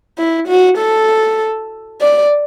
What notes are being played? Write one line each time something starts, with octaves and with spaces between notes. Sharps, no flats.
E4
F#4
A4
D5